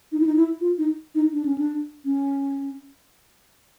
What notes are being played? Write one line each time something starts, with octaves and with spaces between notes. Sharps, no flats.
D#4
E4
D#4
E4
F4
D#4
D#4
D4
C#4
D4
C#4